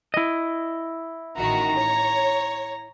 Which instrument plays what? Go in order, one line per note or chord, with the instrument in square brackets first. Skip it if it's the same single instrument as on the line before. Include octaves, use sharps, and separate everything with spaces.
[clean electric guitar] E4 D#5
[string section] A1 D#3 F#4 [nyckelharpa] A#5
[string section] C#5